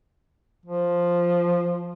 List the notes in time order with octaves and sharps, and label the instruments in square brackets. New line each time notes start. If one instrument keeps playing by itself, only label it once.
[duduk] F3